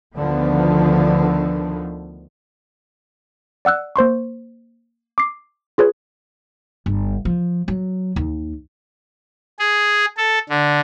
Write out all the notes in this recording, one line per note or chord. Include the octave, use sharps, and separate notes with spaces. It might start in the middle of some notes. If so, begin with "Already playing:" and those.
D2 D3 D#3 F3 B3
D5 F#5 E6 F#6
A#3 C5 C6 C#6
D6 C7
F4 G#4 B4 C#5
G1
F3
F#3
D#2
G#4
A4
D3